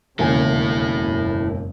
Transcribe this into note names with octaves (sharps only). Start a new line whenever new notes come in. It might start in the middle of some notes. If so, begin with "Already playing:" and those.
E1 D#2 C#3 E4 A4 G#5
F#1